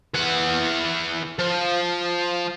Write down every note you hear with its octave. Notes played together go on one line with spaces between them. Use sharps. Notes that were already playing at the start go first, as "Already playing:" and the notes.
E3 F#5
F3